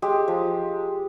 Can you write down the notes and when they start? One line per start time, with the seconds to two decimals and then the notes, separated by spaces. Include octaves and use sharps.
0.02 G#3 G4
0.28 F3